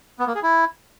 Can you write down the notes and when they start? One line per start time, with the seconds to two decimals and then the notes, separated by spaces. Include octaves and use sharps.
0.19 B3
0.27 A#3
0.35 G#4
0.43 E4